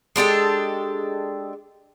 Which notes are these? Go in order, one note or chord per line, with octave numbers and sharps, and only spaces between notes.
G#3 D4 G4 A4